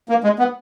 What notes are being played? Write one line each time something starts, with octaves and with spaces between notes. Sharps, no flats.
A#3
G#3
B3